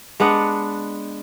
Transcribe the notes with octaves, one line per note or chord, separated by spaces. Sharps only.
G#3 B3 D4 F#5